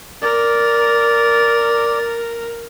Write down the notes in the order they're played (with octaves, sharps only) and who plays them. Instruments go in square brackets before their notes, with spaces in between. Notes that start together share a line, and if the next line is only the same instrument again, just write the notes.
[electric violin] A#4 [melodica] D5